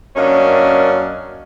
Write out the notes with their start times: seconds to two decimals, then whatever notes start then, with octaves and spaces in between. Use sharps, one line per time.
0.16 F#2 A#3 C#4 D4 D#5